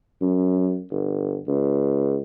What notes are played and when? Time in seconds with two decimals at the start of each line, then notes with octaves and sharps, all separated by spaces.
0.21 F#2
0.90 G1
1.48 C#2